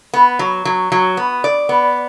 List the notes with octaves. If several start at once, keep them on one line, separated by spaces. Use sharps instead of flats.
B3
F#3
F#3
F#3
B3
D5
B3